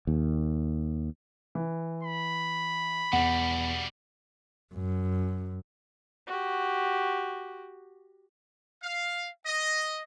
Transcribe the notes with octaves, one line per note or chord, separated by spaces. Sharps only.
D#2
E3
B5
E2 B2 G3 F#5
F#2
F#4 G4
F5
D#5